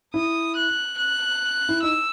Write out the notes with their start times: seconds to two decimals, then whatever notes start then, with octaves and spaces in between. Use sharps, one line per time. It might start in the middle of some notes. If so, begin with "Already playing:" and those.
0.14 E4 D#6
0.56 F#6
0.98 F#6
1.69 E4
1.82 D#4 E6